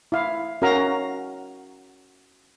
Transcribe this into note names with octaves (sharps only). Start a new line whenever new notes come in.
E4 F5
C#4 F#4 A#4 F5 A#5